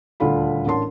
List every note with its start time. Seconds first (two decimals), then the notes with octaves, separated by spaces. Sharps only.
0.20 D#1 D2 D3 D4 F4 B5
0.66 A1 D4 A#4 A5 C6